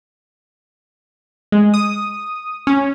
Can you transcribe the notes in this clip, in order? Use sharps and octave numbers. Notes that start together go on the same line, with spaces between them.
G#3
D#6
C#4